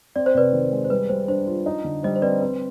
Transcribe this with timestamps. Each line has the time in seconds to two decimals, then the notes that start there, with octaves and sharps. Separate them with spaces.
0.16 C4 D5
0.26 C5
0.35 C3 B4 D5
0.53 D#3
0.72 G#3
0.84 C5
0.90 G3 B4
1.09 G3 C5
1.28 D4 C5
1.47 F4
1.66 D#4
1.84 D3
2.03 G3 C5 D#5
2.16 C5
2.22 C4 B4 D5
2.41 C4 B4